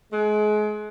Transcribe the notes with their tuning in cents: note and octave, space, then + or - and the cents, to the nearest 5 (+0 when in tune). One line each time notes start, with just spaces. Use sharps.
G#3 +30